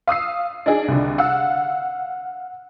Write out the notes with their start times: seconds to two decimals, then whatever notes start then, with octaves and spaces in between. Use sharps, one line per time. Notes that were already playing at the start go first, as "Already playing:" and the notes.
0.07 F5 D#6 E6 C7
0.66 D4 D#4 G#4
0.88 C2 D3
1.18 F5 F#5 E6